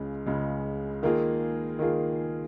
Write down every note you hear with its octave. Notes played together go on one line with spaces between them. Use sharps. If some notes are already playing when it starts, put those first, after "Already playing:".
Already playing: C#2 C#3 G#3
C#2 C#3 G#3
D#3 A#3 F4 G#4
D#3 A#3 F4 G#4